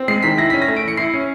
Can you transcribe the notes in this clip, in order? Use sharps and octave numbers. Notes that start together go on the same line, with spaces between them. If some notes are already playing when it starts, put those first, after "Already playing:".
Already playing: C4
G#3 C7
D#3 B6
E4 A#6
C#4 B6
A#6
A3
D7
E3 C#7
E4 C7
C#4